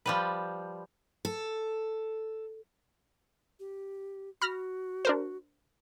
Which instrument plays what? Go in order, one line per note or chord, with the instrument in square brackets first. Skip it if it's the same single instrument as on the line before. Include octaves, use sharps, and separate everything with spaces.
[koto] F3 G3 B4
[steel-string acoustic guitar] A4
[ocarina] G4
[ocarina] F#4 [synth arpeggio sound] B5 F6 A#6
[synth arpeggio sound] D4 A#4 C5